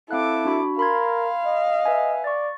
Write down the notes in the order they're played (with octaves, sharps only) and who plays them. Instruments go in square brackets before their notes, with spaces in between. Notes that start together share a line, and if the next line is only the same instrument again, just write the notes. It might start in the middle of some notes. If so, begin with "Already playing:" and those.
[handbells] C4 F5 F#6 [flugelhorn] E4 [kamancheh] A4 D6
[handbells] D4 F#4 B5
[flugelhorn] A#4 [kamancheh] F5 [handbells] B5 C6 G#6
[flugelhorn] D#5
[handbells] B4 E5 G#5
[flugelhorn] D5 [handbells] C#6 A6